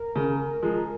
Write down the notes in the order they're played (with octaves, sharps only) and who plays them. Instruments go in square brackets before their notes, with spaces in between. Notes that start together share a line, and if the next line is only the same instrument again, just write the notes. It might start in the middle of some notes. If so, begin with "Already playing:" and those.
Already playing: [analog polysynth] A#4
[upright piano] C#3
F3 G#3